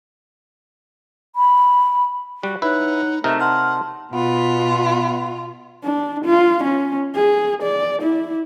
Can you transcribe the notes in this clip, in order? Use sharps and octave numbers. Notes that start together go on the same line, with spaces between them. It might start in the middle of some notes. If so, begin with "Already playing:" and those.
B5
G3 F#4
D#4 E4 B4 C#5 F#5
C3 A3 D#4 A#4 E5
F5 F#5 A5 C6
B2 B3 F4
D4
F4
C#4
G#4
D5
E4